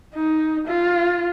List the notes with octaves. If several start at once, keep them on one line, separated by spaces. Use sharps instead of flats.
D#4
F4